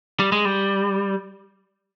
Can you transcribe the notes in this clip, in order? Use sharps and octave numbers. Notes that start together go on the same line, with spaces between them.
G3
G#3
G3